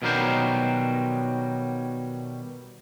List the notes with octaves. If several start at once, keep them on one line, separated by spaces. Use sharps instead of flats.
B2 D#3 F#3 G3 A#4 C5